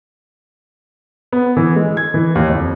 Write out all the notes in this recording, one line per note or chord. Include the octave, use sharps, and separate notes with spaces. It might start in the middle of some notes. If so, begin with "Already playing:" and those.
B3
E3
G#3
G#6
E3
D#2
F2